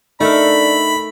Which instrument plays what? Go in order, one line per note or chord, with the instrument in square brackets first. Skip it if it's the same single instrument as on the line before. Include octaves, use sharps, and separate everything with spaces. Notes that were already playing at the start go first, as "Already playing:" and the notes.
[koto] A3 A4 A#4 [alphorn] D4 [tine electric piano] D#4 E5 [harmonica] B5